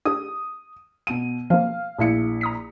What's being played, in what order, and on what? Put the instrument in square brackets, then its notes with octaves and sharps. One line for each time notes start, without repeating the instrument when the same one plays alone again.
[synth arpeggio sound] D4 G4 [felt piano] D#6
[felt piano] B2 D#7
[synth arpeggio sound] F3 A#3 [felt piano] F5
[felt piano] A#1 E4 C#7
[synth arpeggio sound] A#5 D#6 B6